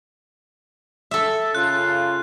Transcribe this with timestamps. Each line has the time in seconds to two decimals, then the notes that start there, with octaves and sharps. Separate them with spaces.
1.11 A4 E5
1.55 C#3 F4 F#6